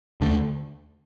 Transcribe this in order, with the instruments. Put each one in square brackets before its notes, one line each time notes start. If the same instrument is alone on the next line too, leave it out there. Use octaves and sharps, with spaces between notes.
[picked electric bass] D#2 D3 A3 D4